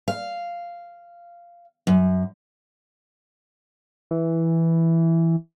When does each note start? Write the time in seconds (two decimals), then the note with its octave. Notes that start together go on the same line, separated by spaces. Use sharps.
0.08 F5
1.87 F#2
4.11 E3